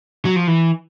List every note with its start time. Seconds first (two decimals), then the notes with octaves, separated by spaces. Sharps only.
0.25 F#3
0.36 F3
0.47 E3